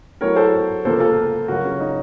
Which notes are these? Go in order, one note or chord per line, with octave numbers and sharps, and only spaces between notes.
A2 F#3 A3 A#4 C#5
A4 C5
C#2 C3 F3 A#3 A4 C5
F4 A4
C#2 C#3 F#3 F#4 A#4
C#4
D#4